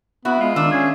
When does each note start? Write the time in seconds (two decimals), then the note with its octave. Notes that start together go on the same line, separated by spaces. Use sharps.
0.25 B3 E4 F#4
0.40 G#3 F4
0.56 D#3 D4 E6
0.72 C#4 G#4